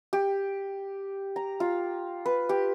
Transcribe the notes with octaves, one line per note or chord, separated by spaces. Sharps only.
G4
A#5
F4
B4
G4